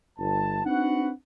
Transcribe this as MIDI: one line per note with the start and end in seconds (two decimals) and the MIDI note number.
0.19 0.60 31
0.19 0.60 81
0.66 1.10 60
0.66 1.10 62
0.66 1.10 63
0.66 1.10 66
0.66 1.10 71
0.66 1.10 78